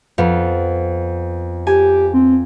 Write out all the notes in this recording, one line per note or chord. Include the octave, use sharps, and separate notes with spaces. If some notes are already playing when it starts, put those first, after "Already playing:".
F2 B3
G4 G#5
C4